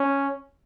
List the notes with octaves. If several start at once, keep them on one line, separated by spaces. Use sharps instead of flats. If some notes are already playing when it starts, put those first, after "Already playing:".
Already playing: C#4